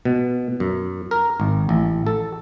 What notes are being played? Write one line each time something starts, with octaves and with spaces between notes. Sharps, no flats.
B2
F#2
A#4
G#1
A1
A4